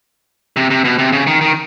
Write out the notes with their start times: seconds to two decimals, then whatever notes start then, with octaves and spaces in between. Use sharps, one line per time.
0.56 C3
0.71 C3
0.85 B2
0.99 C3
1.13 C#3
1.27 D#3
1.41 D#3